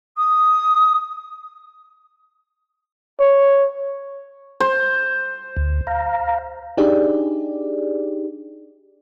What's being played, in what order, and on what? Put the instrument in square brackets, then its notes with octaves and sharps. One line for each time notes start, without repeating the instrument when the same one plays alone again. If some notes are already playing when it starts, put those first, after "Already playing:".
[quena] D#6
[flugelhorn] C#5
[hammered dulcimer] C5
[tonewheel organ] D2
F5 A#5
[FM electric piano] D4 D#4 G4 G#4 D5